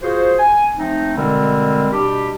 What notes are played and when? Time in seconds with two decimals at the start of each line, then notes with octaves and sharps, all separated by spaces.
0.03 F4 F#4 G#4 C5
0.38 G#5
0.76 F3 A3 C4 D#4
1.16 B2 D3 G3 G#3 C4 A#4
1.92 B2 G3 D4 G4